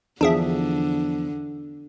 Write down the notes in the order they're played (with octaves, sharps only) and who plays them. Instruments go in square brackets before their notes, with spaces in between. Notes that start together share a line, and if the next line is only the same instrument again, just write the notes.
[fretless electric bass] E2 F3 [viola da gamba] D3 [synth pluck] D4 G#4 E5